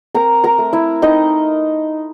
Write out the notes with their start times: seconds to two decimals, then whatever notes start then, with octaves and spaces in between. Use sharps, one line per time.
0.15 C4 A#4 A#5
0.44 A#4 A#5
0.58 A3
0.73 E4 E5
1.02 C4 D#4 D#5